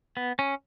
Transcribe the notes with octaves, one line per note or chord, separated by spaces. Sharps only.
B3
C#4